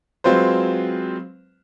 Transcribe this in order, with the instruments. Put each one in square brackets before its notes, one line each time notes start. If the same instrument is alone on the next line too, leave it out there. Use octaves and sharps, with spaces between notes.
[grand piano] F#3 G#3 C4 F4 B4 C5